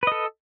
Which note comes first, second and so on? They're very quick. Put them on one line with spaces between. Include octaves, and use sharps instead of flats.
B4 D#5 A4